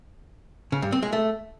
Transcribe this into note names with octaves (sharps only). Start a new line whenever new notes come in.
C#3
G2
C4
G#3
A3